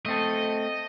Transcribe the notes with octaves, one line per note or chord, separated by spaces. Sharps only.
A3 C4 A4 D#5